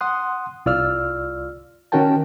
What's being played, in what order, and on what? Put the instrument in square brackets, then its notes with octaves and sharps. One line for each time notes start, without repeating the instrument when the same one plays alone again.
[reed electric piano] F#5 C6 D#6 F#6
C2 F4 D5 E6 F6
D#3 C#4 F#4 A#4 G5 A5